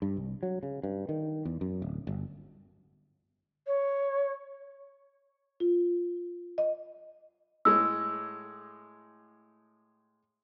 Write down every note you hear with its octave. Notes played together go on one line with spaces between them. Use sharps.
G2
C2
F#3
C#3
G2
D#3
E2
F#2
D1
G1
C#5
F4
D#5
A2 G#3 E6